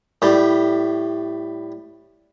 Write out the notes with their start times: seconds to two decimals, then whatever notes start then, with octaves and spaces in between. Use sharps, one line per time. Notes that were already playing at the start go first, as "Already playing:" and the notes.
0.22 A2 G3